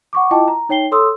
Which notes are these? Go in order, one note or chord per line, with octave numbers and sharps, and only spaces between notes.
F#5 C#6 D6
E4 F4 D#5 G5 A5 D6
A#5
D#4 C#5 G5 C7 G7
A4 C#5 C6 D#6 E6